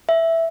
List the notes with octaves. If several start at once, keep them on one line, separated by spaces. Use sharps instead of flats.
E5